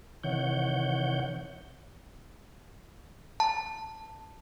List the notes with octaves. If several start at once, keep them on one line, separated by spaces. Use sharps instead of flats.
C3 D#3 E3 C#5 F#5 G6
A5